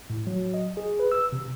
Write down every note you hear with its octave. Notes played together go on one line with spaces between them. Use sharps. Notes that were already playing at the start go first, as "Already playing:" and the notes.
A2
F#3
D#5
G#4
B4
E6
C3